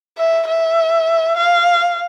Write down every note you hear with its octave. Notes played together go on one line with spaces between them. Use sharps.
E5
E5
F5